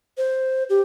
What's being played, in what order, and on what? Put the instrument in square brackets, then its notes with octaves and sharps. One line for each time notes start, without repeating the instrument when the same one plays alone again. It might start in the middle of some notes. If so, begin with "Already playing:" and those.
[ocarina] C5
G4